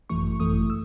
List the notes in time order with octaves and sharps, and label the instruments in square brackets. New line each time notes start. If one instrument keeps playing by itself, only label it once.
[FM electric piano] G#1 F#2 E3 A3 C#6
G#1 F#2 E3 A3 D#6
E6